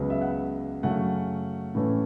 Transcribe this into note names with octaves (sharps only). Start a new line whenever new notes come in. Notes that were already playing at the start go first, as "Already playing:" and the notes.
Already playing: C#2 C#3 F#3 B3
E5
F#5
F#2 C#3 F#3 A3 C#4 F#5
A2 E3 A3 C#4